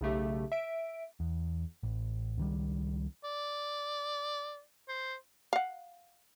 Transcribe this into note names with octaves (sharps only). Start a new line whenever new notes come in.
B1 C#3 A3 G4
E5 D7
E2
A1
C#2 D#3 G3
D5
C5
F5 F#5